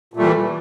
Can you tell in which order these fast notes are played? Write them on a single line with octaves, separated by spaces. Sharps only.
A#2 A3 G3 E3